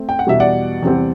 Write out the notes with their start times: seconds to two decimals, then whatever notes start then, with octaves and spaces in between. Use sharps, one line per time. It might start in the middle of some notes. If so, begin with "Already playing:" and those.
Already playing: A3 C4
0.09 G5
0.19 F#5
0.27 E2 B2 G3 E5
0.40 D5 F#5
0.83 E2 C3 G3 C4